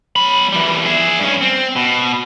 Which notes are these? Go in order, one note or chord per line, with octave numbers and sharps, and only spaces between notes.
F#3 B5
E3 G3
G#4 E5
G2 C#4
C4
B2